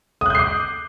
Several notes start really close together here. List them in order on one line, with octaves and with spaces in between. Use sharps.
D#6 F#6 G6 C7 D6